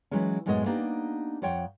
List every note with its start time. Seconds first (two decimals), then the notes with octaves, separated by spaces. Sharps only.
0.11 E3 F#3 G#3 C#4
0.46 F#2 A2 G#3 B3 F#4 D#5
0.66 A#3 B3 D4 D#4 G4
1.42 F2 F4 C#5 F#5 G5